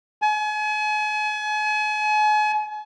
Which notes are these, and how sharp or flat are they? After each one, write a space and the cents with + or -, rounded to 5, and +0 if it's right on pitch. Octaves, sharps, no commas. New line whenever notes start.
G#5 +40